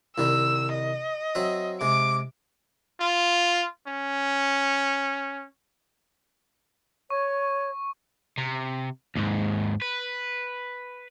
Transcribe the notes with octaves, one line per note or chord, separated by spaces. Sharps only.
C2 D#3 G3 E6
D#5
F#3 C4 E5
C3 G#3 D6
F4
C#4
C#5 C#6
C3
D#2 G#2
B4